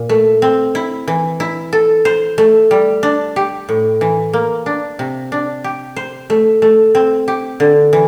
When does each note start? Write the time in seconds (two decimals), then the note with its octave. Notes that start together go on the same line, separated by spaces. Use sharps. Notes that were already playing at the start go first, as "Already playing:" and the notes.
Already playing: A#2
0.09 A3
0.42 C4
0.75 E4
1.08 E3
1.40 E4
1.73 A4
2.05 C5
2.38 A3
2.71 G3
3.03 D4
3.36 G4
3.69 A2
4.01 E3
4.33 A#3
4.66 D4
4.99 C3
5.32 D4
5.64 G4
5.96 C5
6.30 A3
6.62 A3
6.95 C4
7.28 G4
7.60 D3
7.93 E3